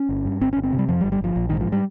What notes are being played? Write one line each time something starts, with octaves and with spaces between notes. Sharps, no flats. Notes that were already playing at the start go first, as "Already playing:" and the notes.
Already playing: C#4
G1
G2
G1 C4
G1 C#4
C4
C3
G3
F2 F3
G3
G1
G3
G1 F3
A#1
G#2 D#3
F3
G3